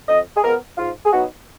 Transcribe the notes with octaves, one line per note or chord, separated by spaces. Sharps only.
F2 D#5
G#4
F3 G#3 B3 A#4
G#2 F4
G#4
F#3 B3 D#4 F#4